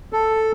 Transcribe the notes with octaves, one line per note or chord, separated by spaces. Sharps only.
A4